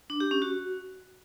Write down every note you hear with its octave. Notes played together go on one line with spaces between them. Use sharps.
D4
G4
C#4
F#4